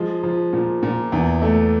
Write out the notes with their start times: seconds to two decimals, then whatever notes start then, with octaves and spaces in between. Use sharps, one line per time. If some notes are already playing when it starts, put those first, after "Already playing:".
Already playing: F3 G#3
0.23 F3
0.53 A#2
0.83 A#2
1.12 E2
1.42 A3